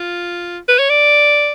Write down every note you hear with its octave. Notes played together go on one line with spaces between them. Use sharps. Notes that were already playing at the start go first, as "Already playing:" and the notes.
Already playing: F4
B4
C#5
D5